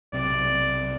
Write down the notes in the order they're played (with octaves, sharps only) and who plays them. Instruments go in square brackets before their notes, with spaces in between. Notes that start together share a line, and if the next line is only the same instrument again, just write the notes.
[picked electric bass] B1 C3 [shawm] D5